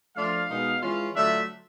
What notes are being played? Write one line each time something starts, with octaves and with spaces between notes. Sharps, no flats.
F3 A3 D4 F4 F5
B2 G#3 B3 D#4
E3 G#3 C#4 F4
D3 F#3 A3 D4 F4 E5